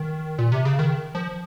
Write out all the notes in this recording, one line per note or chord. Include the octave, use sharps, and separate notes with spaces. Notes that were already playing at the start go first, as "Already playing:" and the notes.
Already playing: D#3
A#2
C3
C#3
D#3
F3